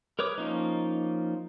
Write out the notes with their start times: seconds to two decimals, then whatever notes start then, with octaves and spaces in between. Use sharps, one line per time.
0.19 A#4 B4 C#5 D6 D#6
0.38 F3 A#3 C#4 D#4